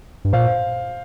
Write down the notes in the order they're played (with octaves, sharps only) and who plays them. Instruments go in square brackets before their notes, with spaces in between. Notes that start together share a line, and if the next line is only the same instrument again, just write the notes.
[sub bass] G2
[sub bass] A#2 [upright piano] C5 F5